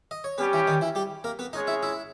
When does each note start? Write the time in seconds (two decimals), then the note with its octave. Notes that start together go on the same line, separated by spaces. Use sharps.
0.11 D#5
0.24 C#5
0.38 G3 B3 C#4 G4 B4
0.53 E3 E4
0.67 D#3 D#4
0.81 E3 E4
0.95 G3 G4
1.24 A#3 A#4
1.39 B3 B4
1.53 G#3 C#4 D#4 G#4 C#5 D#5
1.67 E4 E5
1.83 E4 E5